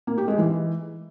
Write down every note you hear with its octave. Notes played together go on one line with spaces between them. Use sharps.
A#3
G4
G#3
E3